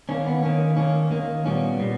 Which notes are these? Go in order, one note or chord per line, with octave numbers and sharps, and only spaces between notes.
D#3 A#3 C#4
B3
D#3 A#3 C#4
D#3 A#3 C#4
D#3 A#3
A#2 G3 B3 C#4
A#2 G3 B3